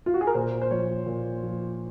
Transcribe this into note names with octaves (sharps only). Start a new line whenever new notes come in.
F4
F#4
G#4
A#4
A#2 C5
C5
F3 C#5
A#2
F3